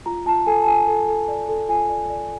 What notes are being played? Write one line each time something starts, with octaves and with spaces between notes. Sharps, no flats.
F4 A#5
F4 A5
A4 G#5
A5
F4 G#5
A4
A4
D5
A4
F4 G#5
D5
D5